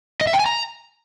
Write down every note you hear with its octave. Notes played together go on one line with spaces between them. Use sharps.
D#5
E5
G5
G#5
A#5